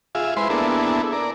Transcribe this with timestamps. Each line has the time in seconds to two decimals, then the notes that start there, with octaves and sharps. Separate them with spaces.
0.15 F4 G#4 E5
0.36 G#3 E4 B4 C5 C6
0.50 A#3 B3 D4 E4 G#4 A4
1.13 A#4 D5